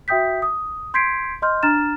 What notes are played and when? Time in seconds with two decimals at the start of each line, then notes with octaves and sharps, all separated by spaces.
0.08 F#4 E5 G5 D#6 G6 B6
0.42 D#6
0.94 C6 G6 G#6 B6 C7 D7
1.42 D#5 C6 F6 G6
1.63 D4 A#5 F6 A6 E7